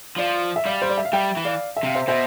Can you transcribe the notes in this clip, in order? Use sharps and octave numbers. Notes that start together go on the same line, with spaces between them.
F3 D5 F5
E5
G3 D5 F5
C5
D5
E5
F5
G3 E5 G5
E3
D5 F5
E5
C3 F5
C5 E5
B2 C5 E5